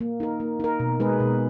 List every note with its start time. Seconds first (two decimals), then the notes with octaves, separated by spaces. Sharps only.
0.01 A#3
0.20 D#4 A#4
0.40 A#3
0.60 D#4 A#4
0.80 B2
1.00 G#3 D#4 G#4 B4
1.20 B2